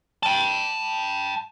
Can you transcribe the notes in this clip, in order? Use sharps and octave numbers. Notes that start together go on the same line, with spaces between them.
G5 A5